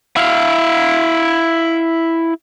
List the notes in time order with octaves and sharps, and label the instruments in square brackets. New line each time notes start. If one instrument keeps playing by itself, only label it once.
[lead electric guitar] E4 F5